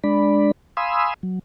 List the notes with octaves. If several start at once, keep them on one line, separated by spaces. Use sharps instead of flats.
G#3 D4 D5 B5
F5 G#5 B5 C6 D#6 E6
F#3